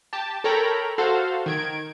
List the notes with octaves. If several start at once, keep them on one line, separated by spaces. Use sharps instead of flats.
G4 A5
A4 A#4 C#5 G5 A#5 B5
F#4 A4 C5 F5
D#3 G#6 D7